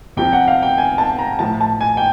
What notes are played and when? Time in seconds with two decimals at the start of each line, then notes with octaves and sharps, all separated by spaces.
0.17 C3 F3 G5
0.33 F#5
0.48 F5
0.63 G5
0.78 G#5
0.98 A5
1.18 A#5
1.39 A2 F3 A5
1.61 A5
1.81 G#5
1.97 G5